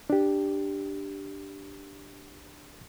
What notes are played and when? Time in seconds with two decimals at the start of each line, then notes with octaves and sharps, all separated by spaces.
0.10 D4 G4